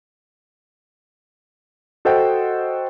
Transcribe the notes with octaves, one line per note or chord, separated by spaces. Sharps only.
F#4 A4 C5 D#5 F#5 G5